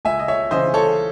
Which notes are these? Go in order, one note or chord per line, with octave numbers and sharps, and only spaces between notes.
C#2 E5 G#5
D#5
C#5 E5
C#3 E3 C5 D#5
A4 C#5